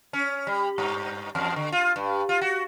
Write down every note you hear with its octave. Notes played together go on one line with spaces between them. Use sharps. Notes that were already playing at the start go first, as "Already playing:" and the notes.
C#4
G3
G2
E2
D3
F4
G2
F4
F#4